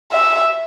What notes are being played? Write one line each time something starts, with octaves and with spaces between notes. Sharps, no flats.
E5